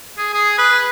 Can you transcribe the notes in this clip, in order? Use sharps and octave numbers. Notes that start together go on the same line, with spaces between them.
G#4
G#4
B4